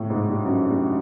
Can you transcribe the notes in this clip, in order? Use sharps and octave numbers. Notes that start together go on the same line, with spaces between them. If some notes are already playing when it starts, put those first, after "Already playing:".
Already playing: A2
G#2
G2
F#2
G2